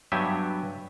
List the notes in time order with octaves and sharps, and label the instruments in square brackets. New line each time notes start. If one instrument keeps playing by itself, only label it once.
[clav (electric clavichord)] G2 F#3 B3 G4 E5 G#5